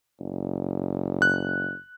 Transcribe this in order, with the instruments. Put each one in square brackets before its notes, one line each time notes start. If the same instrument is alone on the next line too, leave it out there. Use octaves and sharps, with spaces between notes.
[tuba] F#1
[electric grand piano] F#6